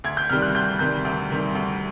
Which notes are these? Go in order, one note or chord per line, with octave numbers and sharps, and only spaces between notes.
D2 G#6
G6
C3 D#3 G3 F6
F#6
D2 G6
C3 D#3 G3 G6
D2
C3 D#3 G3
D2